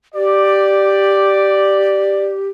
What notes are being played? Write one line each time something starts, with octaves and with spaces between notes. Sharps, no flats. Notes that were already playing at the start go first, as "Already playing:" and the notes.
G4 D5